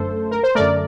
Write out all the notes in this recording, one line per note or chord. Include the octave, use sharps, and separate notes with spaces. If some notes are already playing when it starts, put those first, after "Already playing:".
Already playing: F#2 D3 A3 A4 C5
A#4
C5
F#2 D3 A3 A#4 D5